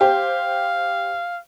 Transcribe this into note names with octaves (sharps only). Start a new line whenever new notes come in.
G4 C5 F5